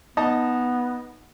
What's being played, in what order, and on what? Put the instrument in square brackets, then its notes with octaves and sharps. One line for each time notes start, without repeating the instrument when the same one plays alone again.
[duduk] B3 [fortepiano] D#4 D#5 A5